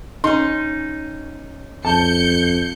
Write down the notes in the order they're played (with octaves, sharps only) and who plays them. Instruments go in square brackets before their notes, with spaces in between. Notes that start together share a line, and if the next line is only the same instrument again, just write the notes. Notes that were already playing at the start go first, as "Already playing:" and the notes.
[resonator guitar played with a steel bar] C#4 D#4 [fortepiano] C6
[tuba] F2 [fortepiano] A5 [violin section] G6 C#7